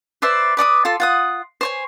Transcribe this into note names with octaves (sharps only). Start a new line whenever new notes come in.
B4 C5 D5 E5
B4 D5 C#6 D#6
F4 A4 C6
F4 F#5 D#6
C5 C#5 G#5